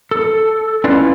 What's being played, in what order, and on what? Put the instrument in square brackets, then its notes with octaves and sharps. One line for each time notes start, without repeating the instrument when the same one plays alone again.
[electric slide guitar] A4
C#4 E4 F4 B4 D5